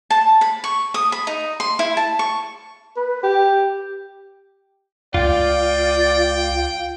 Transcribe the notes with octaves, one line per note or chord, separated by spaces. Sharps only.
A5
B5
C#6
D#6
B5
D#4
C6
E4
A5
C#6
B4
G4
C#2 F4 D5 G5